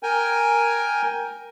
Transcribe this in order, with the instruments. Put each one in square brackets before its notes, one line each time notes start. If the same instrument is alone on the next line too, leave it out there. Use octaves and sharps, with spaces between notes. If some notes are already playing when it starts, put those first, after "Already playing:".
[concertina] A#4 G5 G#5